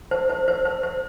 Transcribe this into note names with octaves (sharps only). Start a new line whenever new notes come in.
C5
C5
C5
C5
C5